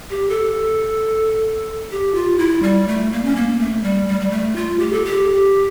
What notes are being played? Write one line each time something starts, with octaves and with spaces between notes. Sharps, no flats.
G4
A4
G4
F4
E4
G3
A3
A#3
C#4
A#3
A3
G3
G3
G3
A3
F4
G4
A4
G4